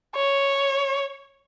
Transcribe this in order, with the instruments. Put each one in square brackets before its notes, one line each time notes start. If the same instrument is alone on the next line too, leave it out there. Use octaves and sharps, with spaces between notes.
[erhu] C#5